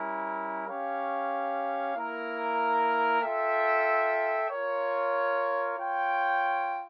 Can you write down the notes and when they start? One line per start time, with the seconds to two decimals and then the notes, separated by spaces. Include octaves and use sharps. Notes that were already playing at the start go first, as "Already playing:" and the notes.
Already playing: G3 C#4 E4 A#4
0.67 C#4 G4 C#5 F5
1.95 A#3 E4 A#4
3.22 F4 A4 E5 G5
4.50 F4 A#4 C#5
5.77 F4 C#5 G5